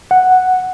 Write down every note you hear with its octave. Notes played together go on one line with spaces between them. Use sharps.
F#5